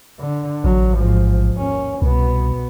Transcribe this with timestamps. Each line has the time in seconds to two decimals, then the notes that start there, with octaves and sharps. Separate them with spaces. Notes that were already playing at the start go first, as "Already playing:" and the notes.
0.21 D3
0.64 A1 F#3
0.96 G#2 F3
1.55 D#2 C#4
2.02 C2 B2 B3